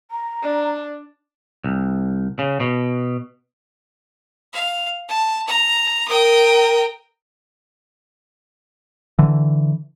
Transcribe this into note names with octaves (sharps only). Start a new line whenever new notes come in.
A#5
D4
C2
C#3
B2
F5
A5
A#5
A#4 G5 D#6
D3 E3